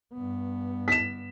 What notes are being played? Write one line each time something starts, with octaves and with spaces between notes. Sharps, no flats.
G2 B3
B6 E7